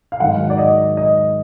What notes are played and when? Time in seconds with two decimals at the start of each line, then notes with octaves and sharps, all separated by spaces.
0.12 F5
0.20 G#2 D#3 F#3 F#5
0.50 D5
0.58 D#5
0.97 D#5